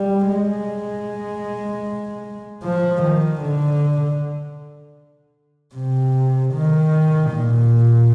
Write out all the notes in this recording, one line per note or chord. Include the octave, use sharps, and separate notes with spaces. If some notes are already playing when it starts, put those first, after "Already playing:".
Already playing: G3
G#3
F3
D#3
D3
C3
D#3
A#2